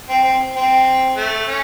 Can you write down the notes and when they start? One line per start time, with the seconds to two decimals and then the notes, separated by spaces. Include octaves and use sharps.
0.09 C4
0.23 C4
0.55 C4
1.16 A3
1.47 C#4